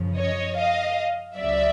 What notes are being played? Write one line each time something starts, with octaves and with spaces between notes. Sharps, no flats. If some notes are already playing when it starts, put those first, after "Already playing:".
Already playing: F#2 C#3 F3
C#5 D#5
D#5 F5
C#2 C#3 F#3 D5 E5